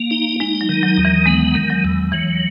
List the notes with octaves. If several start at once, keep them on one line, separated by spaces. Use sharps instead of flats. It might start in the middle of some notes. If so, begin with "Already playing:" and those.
Already playing: A#3
D#4
G#3 D#4
F#3
D#3
F#3
D#2
E3
G#3 B3
D#3
F#3
E2
E3 F#3